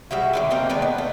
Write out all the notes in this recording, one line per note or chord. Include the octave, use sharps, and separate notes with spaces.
G3 G#3 F#4 E5
A#2 D3 D#3
A#3 C4 D#4
D#3 G#3 D4 B4
B3
A3